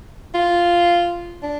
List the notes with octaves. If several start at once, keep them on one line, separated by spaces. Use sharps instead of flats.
F4
D4